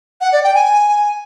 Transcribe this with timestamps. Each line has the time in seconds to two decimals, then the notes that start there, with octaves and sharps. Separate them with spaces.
0.21 F#5
0.32 D5
0.43 G5
0.55 G#5